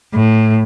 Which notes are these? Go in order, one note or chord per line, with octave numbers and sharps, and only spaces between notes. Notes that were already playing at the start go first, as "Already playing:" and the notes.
A2